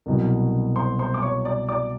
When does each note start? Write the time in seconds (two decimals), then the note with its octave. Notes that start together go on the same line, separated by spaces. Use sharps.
0.06 C2 B2 F#3
0.76 C5 C6
0.99 C5 C6
1.14 D6
1.22 C#5 C#6
1.45 D5 D6
1.69 D5 D6